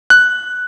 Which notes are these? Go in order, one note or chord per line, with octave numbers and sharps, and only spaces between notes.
F#6